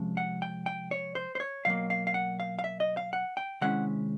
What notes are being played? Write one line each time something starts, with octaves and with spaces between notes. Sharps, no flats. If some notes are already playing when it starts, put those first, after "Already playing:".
Already playing: C3 F3 G#3 C#4
F#5
G5
G5
C#5
C5
C5
C#5
B2 F#3 A#3 F5
F5
F5
F#5
F5
F5
E5
D#5
F5
F#5
G5
C3 D#3 G#3 C#4 E4 F#5